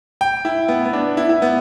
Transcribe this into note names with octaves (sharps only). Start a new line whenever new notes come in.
G5
E4
B3
B3
D4
E4
E4
B3